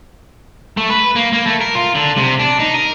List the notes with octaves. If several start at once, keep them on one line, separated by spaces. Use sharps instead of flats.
A3
B4
A#3
A#3
A3
A#4
F4
D3
C3
D4
D#4
A#4